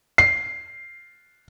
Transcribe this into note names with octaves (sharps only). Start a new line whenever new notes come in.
C7